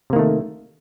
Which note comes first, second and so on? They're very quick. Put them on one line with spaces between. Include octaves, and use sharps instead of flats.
C3 A#3 D#3 A3